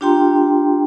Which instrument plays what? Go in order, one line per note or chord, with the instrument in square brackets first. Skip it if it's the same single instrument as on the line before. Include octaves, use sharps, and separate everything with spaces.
[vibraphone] D4 F4 G4 G5 A#5 C6